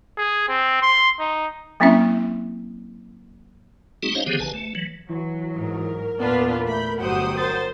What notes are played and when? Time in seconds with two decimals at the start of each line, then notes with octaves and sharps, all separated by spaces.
0.17 G#4
0.48 C4
0.82 C6
1.19 D#4
1.80 F#3 A#3 C4 C#4 E4 E5
4.03 G3 A3 C4 D#4 F#4 G#4
4.15 C#4 D#4 C5 C#5 D#5 F5
4.26 D3 D#3 F3 B3 G4 G#4
4.40 A#1 B4 G#5 A5
4.54 A3
4.75 E3 F#3
5.09 E3 F#3
5.55 G#2 A#4
6.20 E2 A#2 B3 D4 F4 B4
6.67 A3 B5 G6
6.99 G1 F#3 G4 C5 F#5 G5 D#6
7.37 A#4 C5 A6